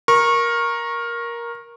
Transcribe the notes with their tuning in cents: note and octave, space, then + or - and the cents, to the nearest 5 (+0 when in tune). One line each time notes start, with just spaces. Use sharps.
A#4 +10 C#6 -20